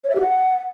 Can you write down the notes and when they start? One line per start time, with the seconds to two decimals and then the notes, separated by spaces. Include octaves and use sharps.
0.04 C#5
0.10 E5
0.15 G4
0.21 F#5